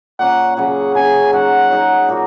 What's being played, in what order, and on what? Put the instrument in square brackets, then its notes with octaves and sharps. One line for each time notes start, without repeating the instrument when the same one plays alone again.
[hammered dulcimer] A#2 A#3 C#4 [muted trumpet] F#5
[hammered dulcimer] C#3 F#3 C#4 G#4 [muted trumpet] F#5
[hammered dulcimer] C#3 F#3 C#4 G#4 [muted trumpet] G#5
[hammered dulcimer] F#3 D#4 G#4 [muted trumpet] F#5
[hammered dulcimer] F#3 D#4 G#4
A#2 A#3 F#4